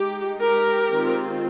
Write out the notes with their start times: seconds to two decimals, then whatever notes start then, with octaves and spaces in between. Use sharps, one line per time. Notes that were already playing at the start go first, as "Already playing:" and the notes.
Already playing: G#3 D#4 G4
0.40 G4 A#4
0.90 D#3 G#3 C4 F4